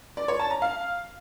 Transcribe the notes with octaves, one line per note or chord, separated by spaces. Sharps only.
D5
C#5
A5
A#5
F5